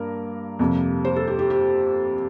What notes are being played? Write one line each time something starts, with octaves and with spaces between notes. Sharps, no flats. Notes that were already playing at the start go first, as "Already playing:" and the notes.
Already playing: G2 A#3 A#4
F2 C3 G3 A#3
C5
A4
G4
G4
G4